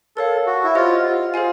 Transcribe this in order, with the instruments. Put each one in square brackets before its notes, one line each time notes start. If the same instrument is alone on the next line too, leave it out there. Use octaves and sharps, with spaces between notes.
[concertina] A4 [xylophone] A#4 C#5 F5
[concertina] F#4
E4
[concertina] F4 [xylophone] G4 C5 D#5 F#5
[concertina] F4
[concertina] F4 [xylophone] G#4 C5 F5 G#5